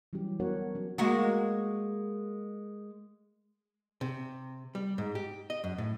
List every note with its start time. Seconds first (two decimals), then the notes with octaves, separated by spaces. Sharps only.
0.13 E3 F#3 G3 C#4 G4
0.40 B3 D4 F#4 A#4 C#5 F#5
0.75 F#3 C#4
0.98 G#3 A#3 F#4
4.01 C3
4.75 G3
4.98 G#2
5.15 G4
5.50 D#5
5.64 F#2
5.78 A2